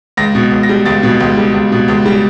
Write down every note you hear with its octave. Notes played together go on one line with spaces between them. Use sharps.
C#2 A#6
B2
C#2
A#6
G3
C#2 A6
B2
C#2
G3
C#2
B2
C#2
G3